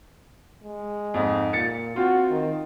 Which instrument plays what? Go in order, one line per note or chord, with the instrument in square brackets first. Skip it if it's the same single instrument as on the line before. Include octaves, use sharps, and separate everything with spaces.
[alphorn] G#3
[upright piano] F2 G#2 D#4
[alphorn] A#2 [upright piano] A6 C#7
[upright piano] C4 F4 [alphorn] F#4
[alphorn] D#3